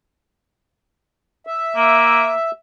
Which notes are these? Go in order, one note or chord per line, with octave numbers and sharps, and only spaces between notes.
E5
A#3